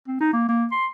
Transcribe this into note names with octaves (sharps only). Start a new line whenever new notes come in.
C4
D#4
A#3
A#3
C6